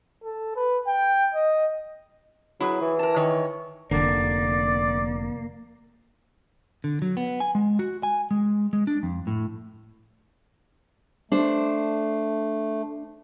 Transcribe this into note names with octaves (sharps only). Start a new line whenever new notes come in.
A4
B4
G5
D#5
F#3 E4 G#4 B4
E3
A#4 A5
D#3 C#5
F1 B1 D3 A#3 D5
D3
F#3
B3
G#5
G#3
F#4
G#5
G#3
G#3
D4
F2
A2
A3 D4 C5